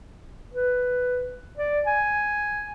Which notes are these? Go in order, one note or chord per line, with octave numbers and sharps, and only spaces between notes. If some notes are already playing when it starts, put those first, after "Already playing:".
B4
D5
G#5